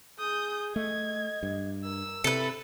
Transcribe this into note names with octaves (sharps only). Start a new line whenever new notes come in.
G#4 D#6 G6
A3 D#5 G#6
G2
A#4 E6
C3 E4 A4 B4